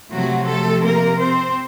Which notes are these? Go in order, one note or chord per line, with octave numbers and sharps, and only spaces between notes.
C3 F3 F#3 A3 F#4
A3 A4
A#3 A#4
C4 C5